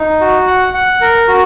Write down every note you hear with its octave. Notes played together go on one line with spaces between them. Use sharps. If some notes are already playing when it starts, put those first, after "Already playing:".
Already playing: D#4
F#4
F#5
F#5
A#4
F#4